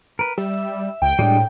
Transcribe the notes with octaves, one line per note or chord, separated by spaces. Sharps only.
A#4 B4
G3 E5
C#2 G5
A2 G3 G#3 D4